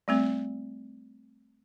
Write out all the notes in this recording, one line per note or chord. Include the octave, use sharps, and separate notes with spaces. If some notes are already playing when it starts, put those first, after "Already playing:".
G3 A3 C4